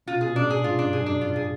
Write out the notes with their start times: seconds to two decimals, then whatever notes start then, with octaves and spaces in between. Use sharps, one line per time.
0.06 B2 F4
0.21 G#4
0.26 B2
0.36 D4
0.45 A2
0.50 G#4
0.64 G#2 F4
0.79 G2 D4
0.93 G#4
1.02 F#2 D4
1.21 F4
1.36 G#4